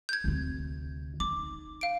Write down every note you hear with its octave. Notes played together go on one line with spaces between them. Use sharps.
G6 G#6
D2 C3
D#4 D6
F5 D7